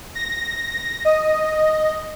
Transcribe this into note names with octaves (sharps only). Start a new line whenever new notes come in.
A#6
D#5